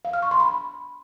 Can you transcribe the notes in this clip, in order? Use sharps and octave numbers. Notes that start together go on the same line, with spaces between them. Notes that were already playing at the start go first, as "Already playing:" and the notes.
F5
F6
C#6
C6
B5